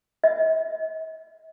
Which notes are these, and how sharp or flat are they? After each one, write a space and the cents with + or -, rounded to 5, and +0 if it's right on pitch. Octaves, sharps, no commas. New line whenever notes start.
D#5 +45